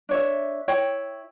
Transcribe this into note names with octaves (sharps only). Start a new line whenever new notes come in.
D4 C#5 E5
E4 C#5 G5